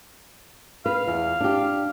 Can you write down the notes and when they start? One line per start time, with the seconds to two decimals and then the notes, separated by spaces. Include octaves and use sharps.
0.86 B4 F5
1.08 E2
1.40 D4 G4